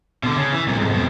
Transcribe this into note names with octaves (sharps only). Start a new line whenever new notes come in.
B2 D3
C#3
E3
C2 A#2
F2 G#2
F2 B2